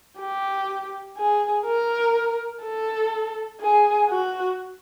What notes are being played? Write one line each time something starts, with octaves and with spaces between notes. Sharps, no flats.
G4
G#4
A#4
A4
G#4
F#4